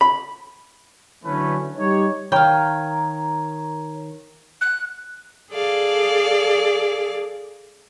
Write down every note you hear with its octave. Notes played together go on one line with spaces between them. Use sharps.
B5
D3 E3 F#3 A3 C#4 B4
G3 D#4 G4 C#5
D#3 A#4 C#5 F5 G5
F#6
G#4 A4 D5 F5